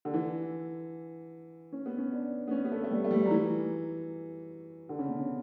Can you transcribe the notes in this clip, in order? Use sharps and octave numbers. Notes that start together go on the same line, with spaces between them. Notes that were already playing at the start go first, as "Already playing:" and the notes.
D3
E3
C#4
B3
C#4
D4
B3
C#4
B3
A3
A3
G3
A3
G3
F#3
E3
D3
C#3
B2
C#3